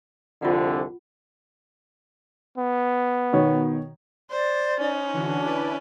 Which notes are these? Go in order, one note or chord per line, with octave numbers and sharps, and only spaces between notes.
C2 F2 D3 F4 F#5
B3
B2 D#3 C#5
C5 D5
C#4 D#4
D3 E3 D4 F#4
E4 B4 D5